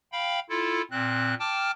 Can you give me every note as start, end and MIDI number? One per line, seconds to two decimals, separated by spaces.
0.12 0.39 77
0.12 0.39 79
0.12 0.39 83
0.49 0.82 64
0.49 0.82 65
0.49 0.82 69
0.91 1.34 46
0.91 1.34 60
0.91 1.34 90
1.40 1.71 79
1.40 1.71 81
1.40 1.71 86
1.40 1.71 89